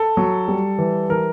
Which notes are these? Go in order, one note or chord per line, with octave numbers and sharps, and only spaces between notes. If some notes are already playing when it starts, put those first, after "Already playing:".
Already playing: A4
F#3
G3
E3
E3 A#4